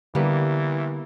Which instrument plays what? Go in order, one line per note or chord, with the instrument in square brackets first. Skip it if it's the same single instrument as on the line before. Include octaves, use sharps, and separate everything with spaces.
[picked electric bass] D3 [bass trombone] E3 [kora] G3 A#3 B3